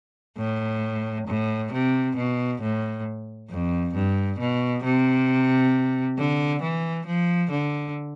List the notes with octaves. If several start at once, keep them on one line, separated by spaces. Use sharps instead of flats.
A2
A2
C3
B2
A2
F2
G2
B2
C3
D3
E3
F3
D3